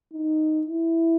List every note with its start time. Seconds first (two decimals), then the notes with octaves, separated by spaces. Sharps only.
0.13 D#4
0.67 E4